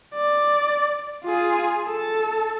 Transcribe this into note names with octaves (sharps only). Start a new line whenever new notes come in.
D5
F4 G#4
A4